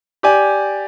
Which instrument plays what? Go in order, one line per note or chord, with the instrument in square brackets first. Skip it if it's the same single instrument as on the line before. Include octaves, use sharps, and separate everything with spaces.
[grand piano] G4 D5 G#5